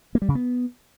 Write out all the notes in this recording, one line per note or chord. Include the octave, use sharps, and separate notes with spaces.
A#3
G3
C#3
B3